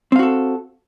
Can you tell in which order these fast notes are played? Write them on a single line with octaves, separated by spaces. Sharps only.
C4 F5 F#4 A4